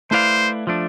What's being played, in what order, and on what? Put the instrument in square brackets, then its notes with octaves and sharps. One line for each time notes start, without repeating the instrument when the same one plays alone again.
[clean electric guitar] A3 E4 B4 D5 F5 [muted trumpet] C5
[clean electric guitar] F3 A3 D4